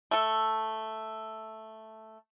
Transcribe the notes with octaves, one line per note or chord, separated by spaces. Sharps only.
A3 A4